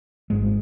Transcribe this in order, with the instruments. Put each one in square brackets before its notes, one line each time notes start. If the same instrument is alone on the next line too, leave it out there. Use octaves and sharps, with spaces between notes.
[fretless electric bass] G#1 G#2 G#3